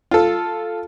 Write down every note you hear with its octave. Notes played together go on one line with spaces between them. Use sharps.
F4 A4